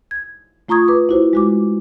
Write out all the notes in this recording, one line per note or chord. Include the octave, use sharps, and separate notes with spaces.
G#6
A3 F4 A#5 C#6 D#6 G#6
B4 D6
E4 F#4 C5
G#3 F#4 D6